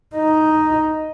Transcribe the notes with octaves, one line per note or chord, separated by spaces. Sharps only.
D#4